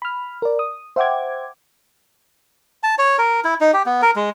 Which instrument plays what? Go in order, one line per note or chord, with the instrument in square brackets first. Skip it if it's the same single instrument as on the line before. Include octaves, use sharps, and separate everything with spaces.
[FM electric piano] B5 F6
A#4 D5
D#6
C5 E5 F#5 G5 D6 G#6
[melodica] A5
C#5
A#4
E4
D#4
G4
B3
A#4
G#3